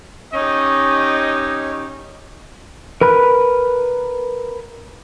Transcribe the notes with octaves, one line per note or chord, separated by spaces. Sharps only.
C#4 D#4 G4 D#5
A#4 B4 B5 F#6